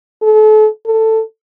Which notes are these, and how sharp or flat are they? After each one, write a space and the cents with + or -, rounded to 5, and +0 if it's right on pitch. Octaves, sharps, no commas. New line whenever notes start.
A4 -35
A4 +10